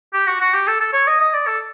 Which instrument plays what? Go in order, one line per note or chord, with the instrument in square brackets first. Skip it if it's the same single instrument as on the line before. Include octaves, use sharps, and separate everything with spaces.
[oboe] G4
F#4
F#4
G4
A4
A4
C#5
D#5
D#5
D5
A4